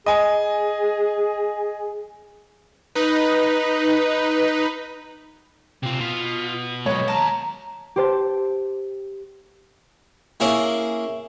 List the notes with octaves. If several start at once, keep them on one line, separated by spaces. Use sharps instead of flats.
G#4 D#5 G#5
D#4 B4
C3 C4 F4
B2 B3 F4
F#3 G#3 B4 C#5 D#5
D#2 A#4 F5 A5 A#5
G4 C5 A5
A#3 C#4 E4 G#4